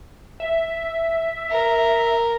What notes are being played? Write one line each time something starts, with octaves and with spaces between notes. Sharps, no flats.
E5
A#4